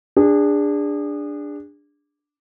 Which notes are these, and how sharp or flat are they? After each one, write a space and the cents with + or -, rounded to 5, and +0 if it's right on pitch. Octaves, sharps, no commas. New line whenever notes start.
D4 +0 G#4 -30